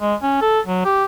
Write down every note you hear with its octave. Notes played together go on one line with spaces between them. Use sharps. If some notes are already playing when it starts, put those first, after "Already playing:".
G#3
C#4
A4
F#3
G4